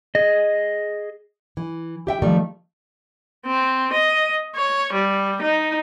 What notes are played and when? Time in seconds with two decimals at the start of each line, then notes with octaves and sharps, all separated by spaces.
0.15 G#4 D#5
1.57 E3
2.07 G4 E5 G5
2.22 D#3 F3 G3 A3
3.47 C4
3.93 D#5
4.56 C#5
4.93 G3
5.42 D#4